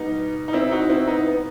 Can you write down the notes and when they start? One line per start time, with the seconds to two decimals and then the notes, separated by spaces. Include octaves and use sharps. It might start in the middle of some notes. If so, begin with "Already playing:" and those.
Already playing: B2 G3 B3 D#4
0.48 D#4
0.53 C4 E4
0.71 D#4 F#4
0.90 C4 E4
1.07 B3 D#4
1.26 B3